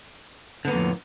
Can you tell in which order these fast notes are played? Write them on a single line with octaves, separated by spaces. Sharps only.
D3 B3 A#3 F2 A2